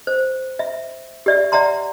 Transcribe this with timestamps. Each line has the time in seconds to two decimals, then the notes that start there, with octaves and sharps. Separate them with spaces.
0.07 C5
0.59 E5
1.26 G4 D5 E5
1.52 D5 E5 F#5 A#5 C6